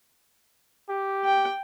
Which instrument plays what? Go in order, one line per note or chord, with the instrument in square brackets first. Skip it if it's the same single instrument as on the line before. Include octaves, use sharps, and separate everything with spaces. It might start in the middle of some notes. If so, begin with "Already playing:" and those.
[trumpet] G4
[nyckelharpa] G5